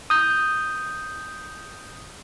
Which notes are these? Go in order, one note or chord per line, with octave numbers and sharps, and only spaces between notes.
D#6 G6